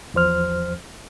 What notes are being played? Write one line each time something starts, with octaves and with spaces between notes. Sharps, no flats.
E2 F3 C5 F6